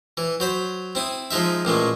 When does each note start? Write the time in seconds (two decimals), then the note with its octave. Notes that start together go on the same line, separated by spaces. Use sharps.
0.17 E3
0.40 F#3 C5 B5
0.95 C4 E4 D#6
1.31 F3 G#3 D#4 E5
1.65 A1 A#2 G#3 A3